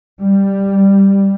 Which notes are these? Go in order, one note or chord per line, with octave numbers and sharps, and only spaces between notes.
G3